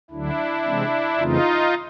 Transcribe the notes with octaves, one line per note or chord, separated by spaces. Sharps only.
D2 D3 F#3 D4 E4
C3 E3 G#3 C4
F2 C#3 E3 A3 C4 D#4 F4